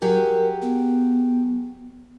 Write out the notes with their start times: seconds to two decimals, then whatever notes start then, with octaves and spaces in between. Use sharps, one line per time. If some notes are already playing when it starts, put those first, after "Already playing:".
0.02 F#3 G4 G#4 A#4
0.62 B3